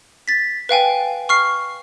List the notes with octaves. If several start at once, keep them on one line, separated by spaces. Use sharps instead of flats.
A6 B6
B4 F5 G5 G#5
C#6 F6 C7